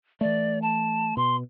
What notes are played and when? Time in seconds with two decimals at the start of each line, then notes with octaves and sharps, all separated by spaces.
0.21 E3 A3 D5
0.62 A5
1.17 B2 C6